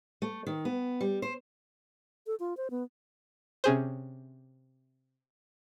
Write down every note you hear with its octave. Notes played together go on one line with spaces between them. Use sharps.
A3
D#3
B3
G3
C5
A4
F4
C5
B3
C3 C#4 G#4 C5